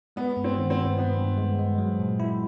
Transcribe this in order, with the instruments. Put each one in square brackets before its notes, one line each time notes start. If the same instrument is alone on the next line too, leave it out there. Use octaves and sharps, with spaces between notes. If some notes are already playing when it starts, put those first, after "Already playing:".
[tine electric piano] G#3 [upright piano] B3
[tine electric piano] G2
[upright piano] C4
[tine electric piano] D#3
[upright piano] C4
[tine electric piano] G2
[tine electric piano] G2 [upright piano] B3
[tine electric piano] G2
G#3
G#3
F#3
A#2
E4